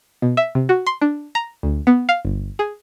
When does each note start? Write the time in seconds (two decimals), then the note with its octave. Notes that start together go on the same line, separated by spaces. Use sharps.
0.22 B2
0.37 E5
0.55 C3
0.69 F#4
0.87 C6
1.02 D4
1.35 A#5
1.63 D2
1.87 B3
2.09 F5
2.25 G1
2.59 G#4